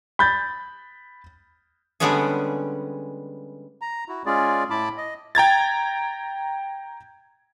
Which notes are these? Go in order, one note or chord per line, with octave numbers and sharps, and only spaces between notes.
B5 G6 A6
D3 G3 G#3 B3 C#4 G#4
A#5
E4 F#4
G#3 C#4 F4 G#4 D5
A2 E4 A5 B5 D6
D#5
G5 A#5 G#6 A6